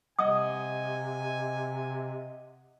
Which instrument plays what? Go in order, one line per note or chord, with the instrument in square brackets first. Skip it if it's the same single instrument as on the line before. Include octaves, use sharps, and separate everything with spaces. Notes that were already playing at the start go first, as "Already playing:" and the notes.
[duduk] C3 [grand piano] D#5 F#5 [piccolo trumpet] G#5 [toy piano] D#6